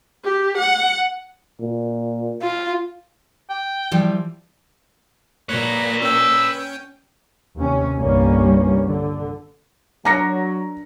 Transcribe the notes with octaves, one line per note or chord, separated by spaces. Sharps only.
G4
F#5
A#2
F4
G5
E3 F3 G3
A#2 B4 C#5 F#6 G#6 A#6
C#4 G5 E6
D#2 C3 C#4
G1 C2 G2 G3 A#3 C#4
D3
F#3 D4 A#4 A#5 A#6 C#7